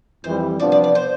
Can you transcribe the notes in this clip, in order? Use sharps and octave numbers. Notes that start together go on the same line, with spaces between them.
F2 E3 G3 C5
C3 F3 B3 D4 D5
D5
D5
C5